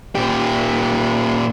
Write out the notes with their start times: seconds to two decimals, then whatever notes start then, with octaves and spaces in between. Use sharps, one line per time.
0.15 A#2 G4